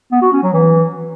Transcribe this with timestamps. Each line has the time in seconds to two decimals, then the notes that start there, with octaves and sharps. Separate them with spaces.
0.12 B3
0.22 F#4
0.32 C#4
0.43 F#3
0.53 E3